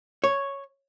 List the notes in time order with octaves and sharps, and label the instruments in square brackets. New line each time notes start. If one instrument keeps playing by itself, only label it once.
[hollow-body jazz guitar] C#5